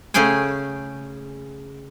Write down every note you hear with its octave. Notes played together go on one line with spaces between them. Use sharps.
C#3 A3 C#4 G#4 G5 G#5